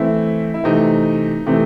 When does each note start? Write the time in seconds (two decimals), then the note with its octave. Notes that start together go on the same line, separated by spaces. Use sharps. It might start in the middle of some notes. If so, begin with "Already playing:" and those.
Already playing: E3 A3 C4 E4
0.54 E4
0.64 C3 E3 A3 C4 D#4
1.46 C3 E3 A3 C4